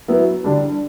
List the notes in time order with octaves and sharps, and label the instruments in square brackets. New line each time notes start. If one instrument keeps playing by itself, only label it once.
[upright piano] F#3 B3 E4
D3 G3 D4